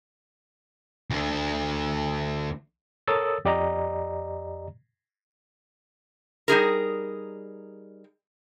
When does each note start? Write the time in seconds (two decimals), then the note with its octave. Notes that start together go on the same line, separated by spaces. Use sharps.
1.11 D2 D3
3.08 A4 A#4 C#5 D#6 E6 A6
3.45 F2 G4 D5 D#5 A#5
6.48 G3 D#4 G#4 A#4